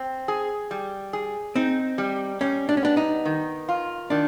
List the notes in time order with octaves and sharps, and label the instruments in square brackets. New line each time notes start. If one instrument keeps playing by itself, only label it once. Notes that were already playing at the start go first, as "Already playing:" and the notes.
Already playing: [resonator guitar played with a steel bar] C4
G#4
G3
G#4
[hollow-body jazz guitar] C4 [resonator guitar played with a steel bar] D#4
[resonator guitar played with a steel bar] G3
[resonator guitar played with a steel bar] G3 [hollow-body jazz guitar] C#4
[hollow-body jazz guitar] D4
C#4
[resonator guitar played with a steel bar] B3 [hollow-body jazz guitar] D4
[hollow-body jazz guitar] D#4
[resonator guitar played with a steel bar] D#3
F4
[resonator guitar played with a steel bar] D#3 [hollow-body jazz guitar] D4